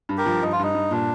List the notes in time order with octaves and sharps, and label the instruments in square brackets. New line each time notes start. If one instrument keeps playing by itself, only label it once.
[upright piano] G2
[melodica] G4 A#4
[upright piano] F3
[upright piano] G2 [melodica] D#4
[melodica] F4
[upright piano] G2 [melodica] D#4
[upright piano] G2
[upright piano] A#2 [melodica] D4